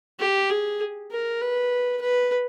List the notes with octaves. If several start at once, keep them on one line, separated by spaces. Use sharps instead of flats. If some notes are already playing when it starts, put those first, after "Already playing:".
G4
G#4
A#4
B4
B4